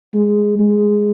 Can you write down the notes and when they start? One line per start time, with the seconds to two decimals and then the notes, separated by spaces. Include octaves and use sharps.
0.14 G#3
0.59 G#3